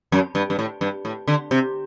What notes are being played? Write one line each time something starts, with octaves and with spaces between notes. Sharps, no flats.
F#2
G2
G2
A2
G2
A2
D3
C3